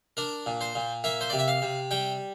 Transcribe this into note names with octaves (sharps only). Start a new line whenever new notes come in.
D4 A#4
A#2
C5
A#2
A#3 E5
C5
C3 D5
E5
F5
C3
G3 G5